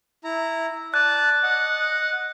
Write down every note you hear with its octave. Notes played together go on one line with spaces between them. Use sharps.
E4 A#5
D5 A5 F#6
D#5 F#5